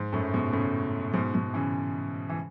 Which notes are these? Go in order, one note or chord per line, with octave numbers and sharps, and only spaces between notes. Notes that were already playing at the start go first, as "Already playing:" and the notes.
Already playing: G#2
F#2 A2
G#2 B2
A2 C#3
G#2 B2
G#2 B2
C#3 E3
E3